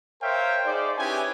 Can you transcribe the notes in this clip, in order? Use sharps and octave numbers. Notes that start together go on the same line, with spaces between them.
A#4 C5 C#5 E5 F5 G5
D#4 G#4 C5 D5
C#4 E4 G4 B4 G#5